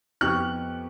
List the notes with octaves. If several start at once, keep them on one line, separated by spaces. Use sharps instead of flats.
F2 B3 G4 C#6 F6 F#6